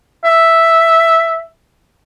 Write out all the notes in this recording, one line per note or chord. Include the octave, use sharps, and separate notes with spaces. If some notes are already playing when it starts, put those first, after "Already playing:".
E5